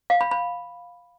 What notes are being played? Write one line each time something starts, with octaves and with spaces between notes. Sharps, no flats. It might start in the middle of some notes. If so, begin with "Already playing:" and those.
F5
B5
B5